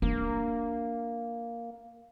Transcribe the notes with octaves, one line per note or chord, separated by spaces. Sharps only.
A#3 D4